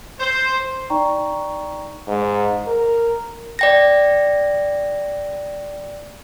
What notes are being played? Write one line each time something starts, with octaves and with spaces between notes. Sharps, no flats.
C5
D#4 D5 G5 A#5 C#6
G#2
A#4
D5 G5 A#6